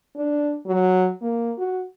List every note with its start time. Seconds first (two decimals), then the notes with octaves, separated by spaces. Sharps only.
0.16 D4
0.66 F#3
1.21 A#3
1.58 F#4